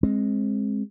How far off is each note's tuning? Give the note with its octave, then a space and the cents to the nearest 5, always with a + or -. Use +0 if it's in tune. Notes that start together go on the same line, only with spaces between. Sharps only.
G#3 +0 C4 +25